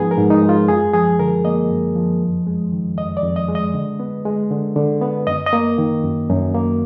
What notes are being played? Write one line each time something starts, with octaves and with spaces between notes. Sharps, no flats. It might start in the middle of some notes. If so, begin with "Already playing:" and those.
Already playing: G#2 F3 G#3 B3 D#4 G#4
A#4
G#2
D#4
G#3
F4
F#2 G#4
F3 G#4
D3 A#4
A#3 D#5
F#2
F3
F2
G#3
D#3
F2 D#5
D5
F2
D#5
G#3
D#5
D3
B3
G#3
D3
D3
B3
F#2 D#5
D#5
A#3
D#3
F#2
F#2
A#3